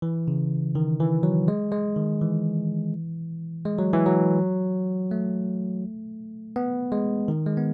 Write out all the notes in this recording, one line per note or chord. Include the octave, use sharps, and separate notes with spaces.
E3
C#3
D#3
E3
F#3
G#3
G#3
D#3
E3
G#3
F#3
E3
F#3
A3
B3
G#3
D#3
G#3
B3